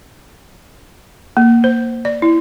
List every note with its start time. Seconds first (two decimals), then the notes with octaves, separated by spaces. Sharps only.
1.37 A#3
1.64 C5
2.05 D5
2.22 E4